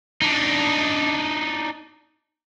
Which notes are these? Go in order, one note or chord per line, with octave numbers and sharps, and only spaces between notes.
D4 D#4